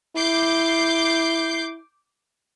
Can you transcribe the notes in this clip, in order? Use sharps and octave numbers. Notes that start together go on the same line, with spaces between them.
E4 D6 G6 C7